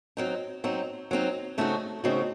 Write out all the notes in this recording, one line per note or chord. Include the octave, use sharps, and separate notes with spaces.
F#3 C4 D#4
F#3 C4 D#4
F#3 C4 D#4
C#3 A3 C4 D#4 F#4
C#3 A3 C4 D#4 F#4